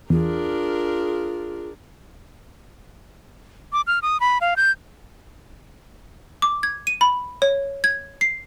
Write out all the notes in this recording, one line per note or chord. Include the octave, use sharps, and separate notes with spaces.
E2 D4 F4 G#4 A#4
D6
F6
D#6
B5
F5
G6
D6
G#6
D#7
B5
C#5
G#6
C7